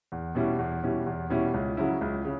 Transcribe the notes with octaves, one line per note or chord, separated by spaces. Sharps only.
E2
B2 G3 C#4 E4
E2
B2 G3 C#4 E4
E2
B2 G3 C#4 E4
C#2
C#3 F#3 C#4 E4
C#2
C#3